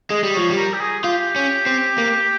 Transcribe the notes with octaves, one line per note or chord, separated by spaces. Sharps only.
G#3 D#5
G3
F3 C#5
G3
A#4
G4
G#4
F4 G4
C#4
C4
A#3